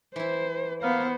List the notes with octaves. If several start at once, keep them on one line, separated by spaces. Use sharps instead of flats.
E3 E4 C5
A#3 B3 C5 F5